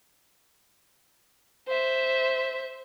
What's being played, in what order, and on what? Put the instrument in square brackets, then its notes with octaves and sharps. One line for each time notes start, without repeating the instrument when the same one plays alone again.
[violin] C5 E5